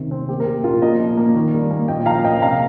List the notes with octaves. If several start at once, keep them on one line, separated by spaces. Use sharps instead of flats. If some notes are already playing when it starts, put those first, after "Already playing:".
Already playing: C3 D#3 C4
C4
A#3 G4
A#4
A#3 G4
A#2 F4 A#4
A#2 A#4 D#5
F3
A#3
D#3
G3
A#3
A#2 D#5 G5
F3 F5 A#5
A#3 D#5 G5
C3 F5 A#5